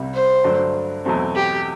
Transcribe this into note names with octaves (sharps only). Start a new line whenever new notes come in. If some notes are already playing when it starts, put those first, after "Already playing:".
Already playing: C2 C3 G3
C5
G2 D3 F#3 A3 D4
E2 B2 F#3 A3 C4
G4